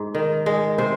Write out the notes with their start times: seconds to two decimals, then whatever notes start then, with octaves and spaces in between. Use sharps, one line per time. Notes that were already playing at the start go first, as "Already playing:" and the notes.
Already playing: G#2
0.15 D#3
0.46 G#3
0.78 C3 C5